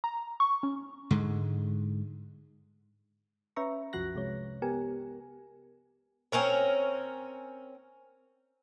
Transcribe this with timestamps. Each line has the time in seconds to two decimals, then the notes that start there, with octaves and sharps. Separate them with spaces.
0.04 A#5
0.40 C#6
0.63 C#4
1.11 G#2 D3 G#3
3.56 C#4 B4 E5 A#5 C#6
3.93 C2 F#2 F3 F#4 F#6 A#6
4.15 C3 G#3 C#5
4.62 B3 G4 A#4 G#5
6.32 C4 C#4 A#4 C#5